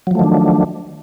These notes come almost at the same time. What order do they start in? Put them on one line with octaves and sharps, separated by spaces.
F#3 F3 A3 D#3 D4